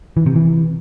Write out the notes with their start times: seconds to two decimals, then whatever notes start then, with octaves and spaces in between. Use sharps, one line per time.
0.17 E3
0.26 C3
0.36 E3